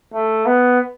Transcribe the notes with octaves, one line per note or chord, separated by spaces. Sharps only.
A3
B3